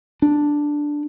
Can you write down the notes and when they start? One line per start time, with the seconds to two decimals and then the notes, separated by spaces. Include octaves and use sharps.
0.22 D4